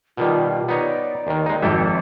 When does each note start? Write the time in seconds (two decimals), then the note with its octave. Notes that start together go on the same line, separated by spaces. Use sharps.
0.17 B2 D#3 G3 F4
0.68 B3 D#4 C#5 D5
1.27 D#2 D#3
1.46 G#3 D#4
1.62 G#1 F2 G4 A4 E5